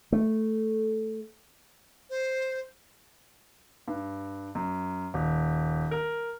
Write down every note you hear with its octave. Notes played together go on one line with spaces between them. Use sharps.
A3
C5
G2
F#2
D#1
A#4